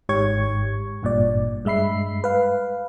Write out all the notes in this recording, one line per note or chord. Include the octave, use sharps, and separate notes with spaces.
G#1 G#2 G4 C#5 C#6 G#6
G#1 G2 A#2 D5
G2 G#3 E5 B5 C7
B4 F5